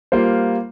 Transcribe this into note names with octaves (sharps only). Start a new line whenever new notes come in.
G3 A#3 F4 C5